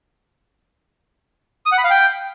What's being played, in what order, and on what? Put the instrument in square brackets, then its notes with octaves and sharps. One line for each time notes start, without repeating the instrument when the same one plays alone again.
[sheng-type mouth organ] D#6
F#5
B5
F5
G5